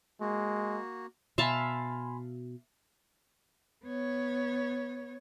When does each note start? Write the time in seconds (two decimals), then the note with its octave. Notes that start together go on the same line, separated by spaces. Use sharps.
0.21 G#3 A#3 F#4
1.38 B2 E5 F5 G#5 A5 B5 C6
3.85 B3 C#5